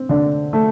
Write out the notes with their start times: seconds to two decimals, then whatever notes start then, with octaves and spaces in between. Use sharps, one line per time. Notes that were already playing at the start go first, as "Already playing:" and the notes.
Already playing: C4
0.09 D3 D5
0.53 A3